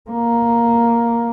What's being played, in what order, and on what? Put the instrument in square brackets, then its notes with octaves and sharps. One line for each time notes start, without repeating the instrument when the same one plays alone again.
[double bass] A#3